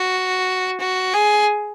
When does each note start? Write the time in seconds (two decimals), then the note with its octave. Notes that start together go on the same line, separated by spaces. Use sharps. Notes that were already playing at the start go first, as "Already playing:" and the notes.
Already playing: F#4
0.80 F#4
1.14 G#4